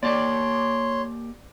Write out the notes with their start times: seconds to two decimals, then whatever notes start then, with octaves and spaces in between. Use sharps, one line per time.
0.03 A#3 G4 C#5 D5 G5 C6